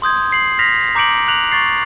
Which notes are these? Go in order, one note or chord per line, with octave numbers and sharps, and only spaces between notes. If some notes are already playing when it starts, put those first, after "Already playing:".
C6 D#6 G6 G#6
C7 F#7
F6 A#6 B6 F7
A#5 D6 G6 C#7 D7 F#7
F#6 F7 F#7
C#6 A6 C7